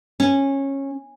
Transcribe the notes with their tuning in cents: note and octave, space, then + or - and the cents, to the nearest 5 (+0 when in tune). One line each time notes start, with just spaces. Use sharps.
C#4 -15